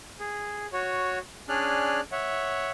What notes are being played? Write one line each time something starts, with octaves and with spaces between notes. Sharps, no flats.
G#4
F#4 C#5
C#4 D4 G#4 D5 F6 F#6
C#5 E5 F#5